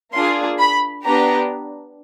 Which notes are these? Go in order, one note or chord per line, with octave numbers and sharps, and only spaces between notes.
A#3 D4 F4 G#4 C6
B5
B3 D4 G4 A#5